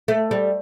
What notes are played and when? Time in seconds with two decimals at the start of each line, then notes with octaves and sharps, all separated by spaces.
0.08 A3
0.31 G3